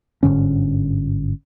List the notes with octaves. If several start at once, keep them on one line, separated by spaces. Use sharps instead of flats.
G1 G#2 D3 C#4